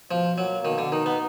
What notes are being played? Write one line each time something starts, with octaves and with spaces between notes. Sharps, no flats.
B2 F3
F#3 A#3
B2 D#3
D3
D#3 D#4
B3